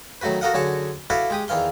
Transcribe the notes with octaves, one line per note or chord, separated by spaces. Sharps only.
D#3 F#3 A3 F#4 B4
F#4 A4 A#4 D#5 F5 F#5
F#2 D3 F#4 G#4 A5 C#6
E4 F#4 A4 B4 D5 F5
G#3 G4 D#6
E2 D#3 E3 F5 C6